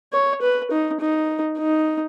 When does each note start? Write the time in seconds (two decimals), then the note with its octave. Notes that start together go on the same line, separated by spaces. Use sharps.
0.13 C#5
0.42 B4
0.71 D#4
1.01 D#4
1.59 D#4